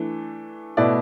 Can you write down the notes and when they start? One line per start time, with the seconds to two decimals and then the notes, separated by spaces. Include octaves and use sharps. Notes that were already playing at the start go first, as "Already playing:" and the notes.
Already playing: E3 A3 D4
0.77 B2 A3 E4 B4 D5